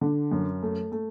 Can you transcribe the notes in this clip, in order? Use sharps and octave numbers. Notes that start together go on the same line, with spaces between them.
D3
F#2
A3
A3